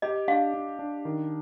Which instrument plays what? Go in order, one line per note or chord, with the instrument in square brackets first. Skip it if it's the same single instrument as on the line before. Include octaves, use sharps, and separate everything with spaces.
[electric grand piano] G4 [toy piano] D#5
[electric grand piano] D4 [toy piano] F5
[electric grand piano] D4
D4
D#3